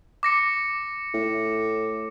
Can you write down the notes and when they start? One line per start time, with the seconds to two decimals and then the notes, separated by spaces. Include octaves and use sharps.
0.23 D6 A#6 C#7
1.14 A2